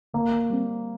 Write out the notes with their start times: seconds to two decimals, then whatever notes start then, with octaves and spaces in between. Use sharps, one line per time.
0.14 D3 A#3
0.50 G3 C4